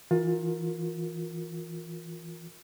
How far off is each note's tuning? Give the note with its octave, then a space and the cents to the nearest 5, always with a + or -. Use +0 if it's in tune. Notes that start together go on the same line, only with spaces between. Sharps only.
E3 +0 F4 +30 A#4 +0